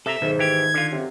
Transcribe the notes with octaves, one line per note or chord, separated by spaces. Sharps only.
C3 A4 E5 A#5
B1 G#2 D#3
E3 G4 G#6
D3 F4
F#2 C3